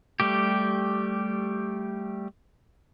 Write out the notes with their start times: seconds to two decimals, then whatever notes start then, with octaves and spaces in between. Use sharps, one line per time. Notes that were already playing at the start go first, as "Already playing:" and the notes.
0.20 G3 A3 G4